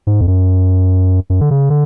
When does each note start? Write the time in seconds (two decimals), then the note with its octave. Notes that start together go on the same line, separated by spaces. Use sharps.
0.07 G#2
0.21 F2
0.27 F#2
1.30 F#2
1.41 D3
1.51 C#3
1.70 D3